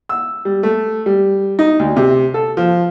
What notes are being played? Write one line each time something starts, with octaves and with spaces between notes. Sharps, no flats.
E6
G3
A3
G3
D#4
D2
C3
A4
F3